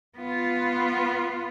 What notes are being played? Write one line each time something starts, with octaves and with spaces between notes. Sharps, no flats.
B3 F4